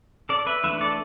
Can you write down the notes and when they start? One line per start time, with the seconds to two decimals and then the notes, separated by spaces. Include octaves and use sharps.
0.29 A4 D5
0.47 B4 E5
0.63 E3 A3 D4 B4 E5
0.81 A4 D5